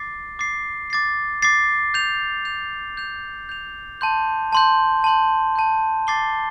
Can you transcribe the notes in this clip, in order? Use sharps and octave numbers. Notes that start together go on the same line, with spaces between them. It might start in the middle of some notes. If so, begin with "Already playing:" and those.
Already playing: D6 A6 C7
D6 A6 C7
D6 A6 C7
D6 A6 C7
G6 F7
G6 F7
G6 F7
G6 F7
A5 C6 G6
A5 C6 G6
A5 C6 G6
A5 C6 G6
D6 A6 C7 G7